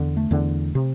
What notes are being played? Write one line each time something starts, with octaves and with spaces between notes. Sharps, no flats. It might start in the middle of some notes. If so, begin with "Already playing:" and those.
Already playing: E2 D3
A3
E2 D3
C3